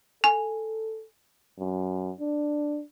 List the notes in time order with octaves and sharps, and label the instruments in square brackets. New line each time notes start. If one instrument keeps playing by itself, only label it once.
[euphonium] A4 [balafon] G#5
[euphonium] F#2
D4